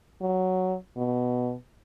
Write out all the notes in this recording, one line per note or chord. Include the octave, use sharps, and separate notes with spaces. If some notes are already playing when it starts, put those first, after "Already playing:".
F#3
B2